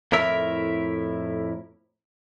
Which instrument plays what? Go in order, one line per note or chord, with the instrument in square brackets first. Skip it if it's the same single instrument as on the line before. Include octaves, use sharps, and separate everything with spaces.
[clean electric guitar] F2 A2 E4 A#4 E5